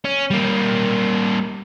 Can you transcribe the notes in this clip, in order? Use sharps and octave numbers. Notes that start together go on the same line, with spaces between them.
C#4
G3 A#3